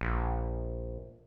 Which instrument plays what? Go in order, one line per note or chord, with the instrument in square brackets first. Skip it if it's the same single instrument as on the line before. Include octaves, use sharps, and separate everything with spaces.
[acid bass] A#1